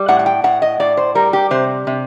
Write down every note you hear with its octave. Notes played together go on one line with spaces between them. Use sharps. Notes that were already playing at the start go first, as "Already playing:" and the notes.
Already playing: G3
A2 F#5
F#5
G5
A2 F#5
D#5
A2 D5
C5
G3 A#4
G4
C3 C5
C3